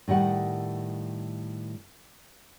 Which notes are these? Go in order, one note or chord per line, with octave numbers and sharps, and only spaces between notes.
A2 D#3 G3 F#5